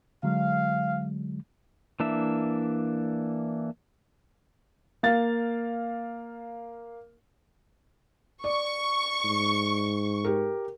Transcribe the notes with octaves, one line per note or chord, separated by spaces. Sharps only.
D3 F#3 G#3 F5
E3 A#3 D4 E5
A#3 F5 A6
D5 C#6
G#2
G4 A#4